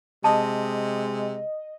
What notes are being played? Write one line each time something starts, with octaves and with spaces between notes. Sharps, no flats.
C3 G#3 D#5 A5